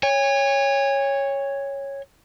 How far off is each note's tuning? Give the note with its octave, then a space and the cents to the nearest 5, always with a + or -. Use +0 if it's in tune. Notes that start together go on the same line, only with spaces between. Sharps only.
C#5 +0 G#5 -45